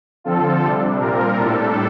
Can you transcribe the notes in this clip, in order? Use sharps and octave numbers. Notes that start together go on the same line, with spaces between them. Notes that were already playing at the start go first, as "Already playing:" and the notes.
D3 F3 C4 F4 A4
C3 G3 D4
A#2 G3 C4 F4 A#4
A2 G3 D4 A4